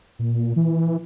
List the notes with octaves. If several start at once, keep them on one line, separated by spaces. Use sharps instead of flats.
A#2
E3